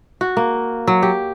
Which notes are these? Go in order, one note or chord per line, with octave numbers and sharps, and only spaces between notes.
F#4
A#3
F#3
G4